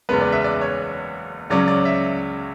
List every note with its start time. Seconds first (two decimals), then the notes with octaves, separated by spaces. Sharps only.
0.09 F#1 E2 C#3 G#3 B3 B4
0.21 D5
0.32 E5
0.44 D5
0.61 C#5
1.50 C#2 C#3 F#3 C#4 D5
1.68 D5
1.85 E5